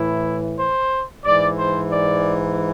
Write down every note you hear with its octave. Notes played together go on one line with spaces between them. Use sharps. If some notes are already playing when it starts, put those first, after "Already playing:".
Already playing: A2 E3 E4
C5
G#2 E3 D5
C5
D5